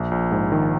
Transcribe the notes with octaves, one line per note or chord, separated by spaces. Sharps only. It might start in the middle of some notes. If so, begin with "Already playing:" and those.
Already playing: A#1
A#1
G#2
D#3